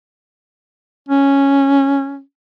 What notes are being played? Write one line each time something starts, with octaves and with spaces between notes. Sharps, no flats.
C#4